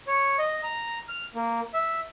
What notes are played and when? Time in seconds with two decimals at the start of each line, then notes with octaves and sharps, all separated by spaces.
0.07 C#5
0.39 D#5
0.63 A#5
1.08 F6
1.35 A#3
1.74 E5